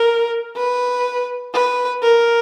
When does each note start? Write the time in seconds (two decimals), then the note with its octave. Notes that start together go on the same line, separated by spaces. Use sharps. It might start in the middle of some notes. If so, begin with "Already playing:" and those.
Already playing: A#4
0.56 B4
1.54 B4
2.03 A#4